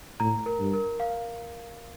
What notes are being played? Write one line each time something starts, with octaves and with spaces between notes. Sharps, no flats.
A2 A#5
A#4
G2
A#4
F5